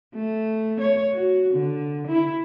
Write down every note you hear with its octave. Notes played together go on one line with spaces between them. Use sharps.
A3
C#5
F#4
D3
E4